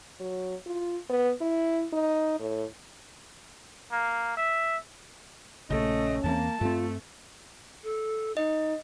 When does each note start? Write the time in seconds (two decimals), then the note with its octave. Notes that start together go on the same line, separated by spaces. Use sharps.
0.20 F#3
0.66 F4
1.10 B3
1.41 E4
1.93 D#4
2.40 A2
3.92 A#3
4.37 E5
5.70 A#1 C#3 A3 C#4 D#5
6.24 E2 E3 A#3 C4 A5
6.61 G2 A3 C4 F4
7.83 A4
8.37 D#4 D#5